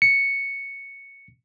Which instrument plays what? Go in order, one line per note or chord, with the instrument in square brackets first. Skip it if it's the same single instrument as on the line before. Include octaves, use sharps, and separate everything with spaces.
[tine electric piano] C#7